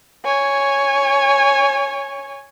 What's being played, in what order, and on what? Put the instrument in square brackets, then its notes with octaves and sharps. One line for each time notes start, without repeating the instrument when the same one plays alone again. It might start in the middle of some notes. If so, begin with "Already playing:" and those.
[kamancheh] C#5 G#5